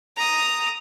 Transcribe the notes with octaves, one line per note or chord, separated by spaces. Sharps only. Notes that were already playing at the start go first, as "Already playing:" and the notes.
A#5 D#6